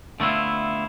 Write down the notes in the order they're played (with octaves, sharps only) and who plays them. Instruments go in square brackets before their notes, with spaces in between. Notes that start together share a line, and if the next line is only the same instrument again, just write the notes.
[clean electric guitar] D3 A3 B3 E4 F4